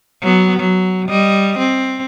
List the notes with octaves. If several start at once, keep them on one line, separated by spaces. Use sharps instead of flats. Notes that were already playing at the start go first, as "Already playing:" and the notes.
F#3 B3
F#3
G3 D#5
C4